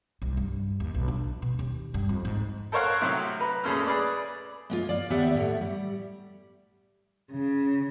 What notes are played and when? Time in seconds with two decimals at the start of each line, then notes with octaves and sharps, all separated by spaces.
0.22 C2
0.37 G2
0.80 D#2
0.95 B1
1.08 D4
1.42 B2
1.59 D#2
1.94 G2
2.09 F2
2.25 G#2
2.72 A4 A#4 C5 C#5 F5 F#5
3.01 A2 C3 F#3
3.40 B4 A#5
3.64 F#2 A#2 A3 C#4 G#4 A4
3.87 G#4 B4 D5
4.70 G#3 A#3 F4
4.89 D5 F5
5.10 D#2 B3 G4 D5 E5 F#5
5.34 A2 A3
5.61 G3
7.32 C#3